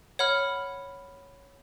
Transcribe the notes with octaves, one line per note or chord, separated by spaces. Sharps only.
C#5 F#5 B5 F6